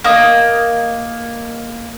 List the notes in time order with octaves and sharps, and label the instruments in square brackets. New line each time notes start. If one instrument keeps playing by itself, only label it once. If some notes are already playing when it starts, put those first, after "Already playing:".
[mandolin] A#3 D#5